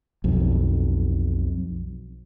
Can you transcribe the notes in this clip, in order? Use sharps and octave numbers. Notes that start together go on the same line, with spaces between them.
B1 F2